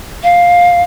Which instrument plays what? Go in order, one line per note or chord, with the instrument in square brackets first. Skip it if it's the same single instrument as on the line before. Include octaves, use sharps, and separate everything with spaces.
[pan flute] F5